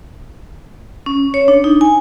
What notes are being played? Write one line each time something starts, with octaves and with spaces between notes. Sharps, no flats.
C#4
C#5
D4
D#4
G#5